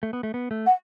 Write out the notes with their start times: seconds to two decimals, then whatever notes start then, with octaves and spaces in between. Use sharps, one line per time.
0.03 A3
0.13 B3
0.23 A3
0.34 B3
0.51 A3
0.66 F#5